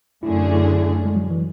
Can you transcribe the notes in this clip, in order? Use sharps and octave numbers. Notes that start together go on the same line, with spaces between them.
F#2 D3 A3 C#4 E4 G#4
E4
G#3
F#3
E3